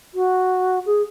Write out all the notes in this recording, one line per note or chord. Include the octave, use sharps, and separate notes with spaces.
F#4
G#4